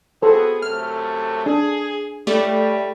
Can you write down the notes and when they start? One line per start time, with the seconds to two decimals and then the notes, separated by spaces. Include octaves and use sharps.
0.22 B3 F#4 G#4 A4 C5
0.62 F#2 C3 A3 F6
1.46 D4 G#4
2.27 A2 G3 A3 G4 D5